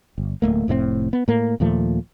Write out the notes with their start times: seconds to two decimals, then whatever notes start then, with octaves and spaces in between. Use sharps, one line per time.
0.18 G1
0.42 D1 G1 A3 A#3
0.68 F1 A2 C3 C4
1.13 B3
1.28 A2 A#3
1.60 D#2 A#2 F3 A3